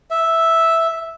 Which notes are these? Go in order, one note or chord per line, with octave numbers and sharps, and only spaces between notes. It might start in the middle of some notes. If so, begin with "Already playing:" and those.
E5